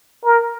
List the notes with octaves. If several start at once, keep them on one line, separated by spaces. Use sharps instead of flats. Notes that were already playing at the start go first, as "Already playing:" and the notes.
A#4